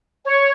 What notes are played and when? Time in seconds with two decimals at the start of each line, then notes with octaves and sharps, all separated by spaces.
0.25 C#5